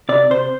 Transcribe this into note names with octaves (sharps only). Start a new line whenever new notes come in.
C3 D5
C3 C5